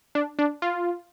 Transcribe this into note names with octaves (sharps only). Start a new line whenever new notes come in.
D4
D4
F4